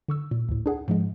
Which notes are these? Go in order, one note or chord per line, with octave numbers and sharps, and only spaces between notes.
D3 C#6 E6
A#2
D2 A2
D4 G#4 F#5
G#2 F3 G#3